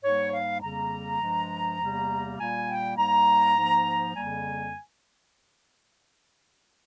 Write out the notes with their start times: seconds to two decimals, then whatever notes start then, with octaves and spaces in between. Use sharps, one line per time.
0.03 G#2 G3 A#3 C#5
0.32 F5
0.62 F2 C#3 G3 A#3 A#5
1.21 G2 F3 G#3
1.80 E2 C3 G3 A#3
2.38 A#2 G3 A#3 G#5
2.68 G5
2.97 G#2 G3 A#3 A#5
3.57 G#2 F3 A#3
4.15 F2 C#3 G3 A#3 G#5